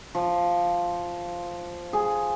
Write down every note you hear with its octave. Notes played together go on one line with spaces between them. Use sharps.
F3
G#4